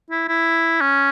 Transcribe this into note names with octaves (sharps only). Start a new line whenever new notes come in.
E4
E4
C#4